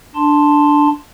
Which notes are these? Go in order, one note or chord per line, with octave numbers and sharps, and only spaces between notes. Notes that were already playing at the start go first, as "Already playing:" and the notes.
D4 A5 C6